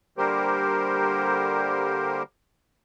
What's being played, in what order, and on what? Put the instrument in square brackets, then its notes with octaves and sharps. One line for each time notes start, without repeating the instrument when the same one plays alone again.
[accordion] D3 G3 A#3 G4 A#4 C5